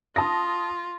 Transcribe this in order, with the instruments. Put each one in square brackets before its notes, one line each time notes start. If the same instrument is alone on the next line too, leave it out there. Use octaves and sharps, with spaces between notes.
[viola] F4 [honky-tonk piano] A5 D#6 A#6